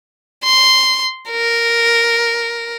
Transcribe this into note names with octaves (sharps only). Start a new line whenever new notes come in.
C6
A#4